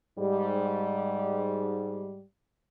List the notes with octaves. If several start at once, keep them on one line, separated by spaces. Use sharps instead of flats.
G#2 G3